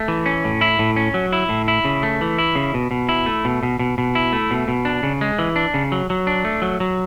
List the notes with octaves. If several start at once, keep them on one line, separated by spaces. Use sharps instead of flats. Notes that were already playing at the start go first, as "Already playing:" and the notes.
Already playing: A3
E3
C#4
A2
E4
A2
C#4
F#3
E4
A2
E4
C#3
A3
E3
E4
C#3
B2
B2
E4
A3
B2
B2
B2
B2
E4
A3
B2
B2
D4
C#3
G#3
E3
D4
C#3
F#3
F#3
D4
A3
F#3
F#3